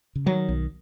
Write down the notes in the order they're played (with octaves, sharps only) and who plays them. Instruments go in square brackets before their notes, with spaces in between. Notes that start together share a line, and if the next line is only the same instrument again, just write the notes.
[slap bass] C#3
[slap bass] D#3 [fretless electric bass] F#3
[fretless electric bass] B1